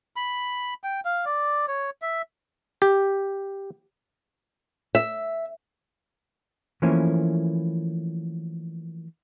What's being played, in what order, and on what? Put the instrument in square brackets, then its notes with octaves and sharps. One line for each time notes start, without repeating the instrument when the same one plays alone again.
[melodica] B5
G5
F5
D5
C#5
E5
[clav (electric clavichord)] G4
[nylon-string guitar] E5
[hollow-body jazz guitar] E3 F3 A3 A#3 C#4 E4